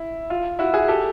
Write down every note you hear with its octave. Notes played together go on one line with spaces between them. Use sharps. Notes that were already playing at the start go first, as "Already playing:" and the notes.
Already playing: E4
F4
E4 F#4
F#4 G#4
G4 A4